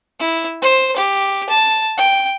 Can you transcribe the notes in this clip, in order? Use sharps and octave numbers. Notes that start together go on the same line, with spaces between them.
E4
C5
G4
A5
G5